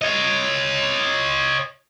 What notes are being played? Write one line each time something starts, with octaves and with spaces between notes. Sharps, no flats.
C#5 D#5